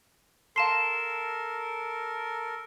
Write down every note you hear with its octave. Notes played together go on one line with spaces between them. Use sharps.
A4 A#4 F5 A5 C6 C7 E7